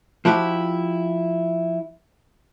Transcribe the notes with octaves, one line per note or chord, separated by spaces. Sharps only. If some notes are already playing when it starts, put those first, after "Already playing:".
F3 E4 F#4 G4